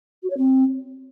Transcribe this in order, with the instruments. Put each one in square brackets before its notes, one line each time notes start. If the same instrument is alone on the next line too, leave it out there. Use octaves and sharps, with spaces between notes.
[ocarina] F#4
C#5
C4